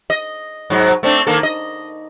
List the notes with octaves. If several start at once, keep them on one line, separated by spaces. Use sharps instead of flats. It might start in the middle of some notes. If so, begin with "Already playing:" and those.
D#5
G#2 F#3
A3 C4 D4
D#3 A#3 A4
D#5